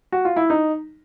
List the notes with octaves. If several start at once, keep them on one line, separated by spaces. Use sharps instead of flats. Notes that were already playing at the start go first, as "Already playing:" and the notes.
F#4
F4
E4
D#4